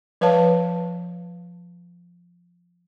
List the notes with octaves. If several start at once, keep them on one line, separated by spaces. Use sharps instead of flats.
F3 B4 C#5 F5 A5